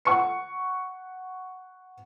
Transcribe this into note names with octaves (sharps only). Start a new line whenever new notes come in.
F#5 C#6 C#7